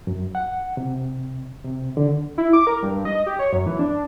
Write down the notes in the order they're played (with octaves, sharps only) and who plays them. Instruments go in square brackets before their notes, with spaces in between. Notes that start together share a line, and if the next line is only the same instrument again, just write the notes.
[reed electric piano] F#2
F#5
C3
C3
D3
[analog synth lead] E4
D6
A#4
G2
D#5
G4
C#5
F#2
E3
D4